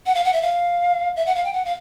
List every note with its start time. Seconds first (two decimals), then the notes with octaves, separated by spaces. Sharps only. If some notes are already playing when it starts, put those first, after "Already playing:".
0.06 F#5
0.15 F5
0.24 F#5
0.33 E5
0.42 F5
1.16 E5
1.26 F#5
1.35 F5
1.44 G5
1.53 F#5
1.65 F5